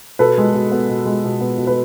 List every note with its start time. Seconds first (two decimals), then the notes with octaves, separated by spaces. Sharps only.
0.19 B2 A4 B4
0.38 G#3
0.54 B2
0.72 B3
0.89 B2
1.06 G#3
1.24 B2
1.41 B3
1.58 B2
1.67 B4